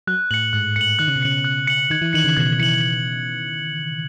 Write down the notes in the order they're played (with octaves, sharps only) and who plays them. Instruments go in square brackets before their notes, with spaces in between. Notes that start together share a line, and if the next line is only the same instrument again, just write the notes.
[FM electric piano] F#3 [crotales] F#6
[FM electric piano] A2 [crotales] F#7
[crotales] C#7
[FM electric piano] G#2 [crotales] F#6
[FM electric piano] A2 [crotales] C#7
[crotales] F#7
[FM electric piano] D#3 [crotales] F#6
[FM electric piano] C#3
B2
[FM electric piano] C#3 [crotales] C#7 F#7
[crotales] F#6
C#7 F#7
[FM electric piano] D#3 [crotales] G#6
[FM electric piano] E3
[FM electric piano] D#3 [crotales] C#7 F#7
[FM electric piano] C#3
[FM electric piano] B2 [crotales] G#6
[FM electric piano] E3 [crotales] C#7
[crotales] F#7